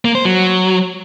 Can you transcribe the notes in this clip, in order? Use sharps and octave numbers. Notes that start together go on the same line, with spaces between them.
A#3
C5
F#3